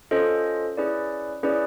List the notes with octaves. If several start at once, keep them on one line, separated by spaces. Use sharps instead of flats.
C#4 F4 A4 C5 D#5
C#4 E4 G#4 B4 D5
C#4 E4 G#4 B4 D5